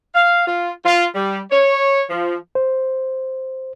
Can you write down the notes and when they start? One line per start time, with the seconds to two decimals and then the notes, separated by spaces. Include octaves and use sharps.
0.15 F5
0.46 F4
0.85 F4
1.15 G3
1.51 C#5
2.10 F3
2.55 C5